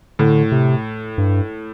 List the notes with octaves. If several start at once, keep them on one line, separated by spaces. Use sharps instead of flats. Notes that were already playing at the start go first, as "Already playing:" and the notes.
A2 D3
C3
G2